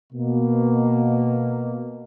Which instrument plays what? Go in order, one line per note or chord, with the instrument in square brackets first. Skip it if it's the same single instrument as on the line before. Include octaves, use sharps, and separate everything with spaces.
[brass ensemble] B2 A#3